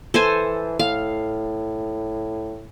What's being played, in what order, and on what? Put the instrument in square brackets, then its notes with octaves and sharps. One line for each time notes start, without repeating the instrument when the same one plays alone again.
[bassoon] E3 [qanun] A4 C5 G#5
[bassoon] A2 [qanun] F5